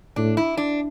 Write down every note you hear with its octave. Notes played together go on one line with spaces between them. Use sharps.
A2 D4
E4
D4